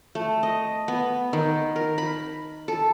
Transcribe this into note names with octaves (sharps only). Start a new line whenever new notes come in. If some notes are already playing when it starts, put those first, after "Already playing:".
A3
D#5
B3
D#3
A#4
B5
A4